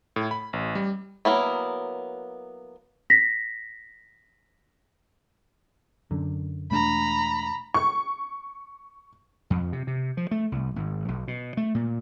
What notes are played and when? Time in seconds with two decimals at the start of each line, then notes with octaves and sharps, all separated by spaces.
0.16 A2
0.31 B5
0.53 A1
0.75 G3
1.25 F#3 A#3 B3 E4
3.10 A#6 B6
6.11 F#2 D3
6.71 E1 A3 D4 A#5 B5
7.74 C#6
9.50 F2
9.73 C3
9.87 C3
10.17 F3
10.31 A3
10.52 C2
10.76 G#1
11.08 B1
11.28 B2
11.57 A3
11.75 A#2